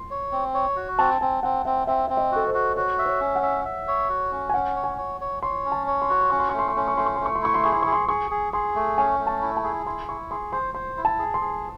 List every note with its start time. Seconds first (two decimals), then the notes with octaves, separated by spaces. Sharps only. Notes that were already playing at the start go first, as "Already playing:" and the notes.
Already playing: C6
0.11 C#5
0.32 C4
0.54 C#5
0.76 F#4
0.99 C4 A5
1.21 C4 G#5
1.43 C4 F#5
1.65 C4 E5
1.87 C4 E5
2.08 C4 E5
2.17 D#5
2.32 F#4 A4
2.47 C5
2.54 F#4
2.76 F#4 C#5
2.99 E5
3.06 C#5
3.20 C#4
3.36 F#5
3.43 E5
3.65 E5
3.88 C#5
4.09 F#4
4.32 C#4
4.49 G#5
4.54 C#4 F#5
4.76 C#5
4.84 G#5
4.98 C#5
5.21 C#5
5.43 C#5 C6
5.65 C#4
5.72 A5
5.87 C#5
6.02 C6
6.09 F#4 C#6
6.21 C6
6.30 C#4 C#6
6.39 C6
6.49 A3 C#6
6.59 C6
6.68 C#6
6.76 C#4 C6
6.88 C#6
6.97 A3 C6
7.06 C#6
7.16 A3 C6
7.26 C#6
7.36 C6
7.42 E4 C#6
7.54 C6
7.64 G#4 C#6
7.73 C6
7.82 G#4 C#6
7.92 C6
8.09 G#4 C#6
8.31 G#4
8.53 G#4 C6
8.75 A3
8.98 C#4 G#5
9.19 A3
9.27 A5
9.42 E4
9.57 A5
9.64 G#4
9.86 E4 C6
10.09 E4 C#6
10.31 G#4 C6
10.53 C5 C6
10.75 C5 C6
10.97 E4
11.05 A5
11.19 G#4
11.34 C6
11.41 G#4